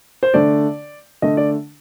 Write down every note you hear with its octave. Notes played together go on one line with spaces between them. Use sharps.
C5
D3 A3 D5
D3 A3 D#5
D5